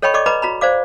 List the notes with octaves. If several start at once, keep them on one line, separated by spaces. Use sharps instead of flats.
A4 C#5 D#5 G5 B5 C#6
A4 D5 D#5 C#6 D6
B4 D#5 A#5 B5 D6
F#4 A#5 B5
C5 D5 F5 D6